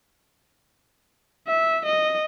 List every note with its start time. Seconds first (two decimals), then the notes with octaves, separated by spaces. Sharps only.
1.48 E5
1.86 D#5